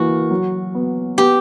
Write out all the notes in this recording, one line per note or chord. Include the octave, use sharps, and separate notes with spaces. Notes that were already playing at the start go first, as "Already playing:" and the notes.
Already playing: E3 A#3 F#4
F#3
B3
B3 G4